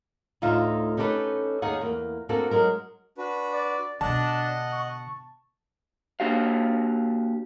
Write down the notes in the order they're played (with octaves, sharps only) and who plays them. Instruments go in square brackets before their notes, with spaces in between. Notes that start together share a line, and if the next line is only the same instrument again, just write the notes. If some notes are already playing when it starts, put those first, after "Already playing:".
[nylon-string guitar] D2 A2 D#4 F4 E5 F5
C#4 D#4 G4 A4 B4
D#2 D#4 G#4 C#5 F5 F#5
E2 A#3
A#3 C4 D4 F#4 A4
F#3 G#3 A#4
[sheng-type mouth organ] D4 F#4 B4
[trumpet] D5
[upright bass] B2 D3 [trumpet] D4 [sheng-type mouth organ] D#5 F#5 [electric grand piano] A5
[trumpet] C#6
[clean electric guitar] A#3 D4 F#4 G4 F5